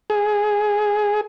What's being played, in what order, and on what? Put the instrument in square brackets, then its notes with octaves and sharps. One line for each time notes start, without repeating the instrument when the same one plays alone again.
[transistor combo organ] G#4